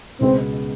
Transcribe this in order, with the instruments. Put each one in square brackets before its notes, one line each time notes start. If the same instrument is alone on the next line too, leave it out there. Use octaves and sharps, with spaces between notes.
[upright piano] C#2 B2 G#3 B3 [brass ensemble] C4